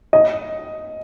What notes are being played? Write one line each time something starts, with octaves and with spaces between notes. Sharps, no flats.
D#5